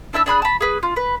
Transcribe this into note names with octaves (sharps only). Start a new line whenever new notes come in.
D4 E4 E5 A5
D4 G#4 B5 F#6
A5 B5
G#4 B4
F4
B4